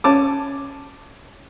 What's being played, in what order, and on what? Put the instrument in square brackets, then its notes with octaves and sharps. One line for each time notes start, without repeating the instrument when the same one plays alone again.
[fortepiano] C#4 A5 D6